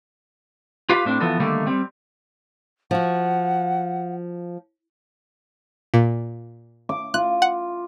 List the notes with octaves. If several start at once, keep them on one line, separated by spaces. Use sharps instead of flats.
F4 G4 B4 F5
A2 C4 D4
E3 F3 B3 F#4 A4
D3 D#3 G3 A3 A#3
G3 C4
F3 F#4 F#5
A#2
D6
F4 F#6
F#5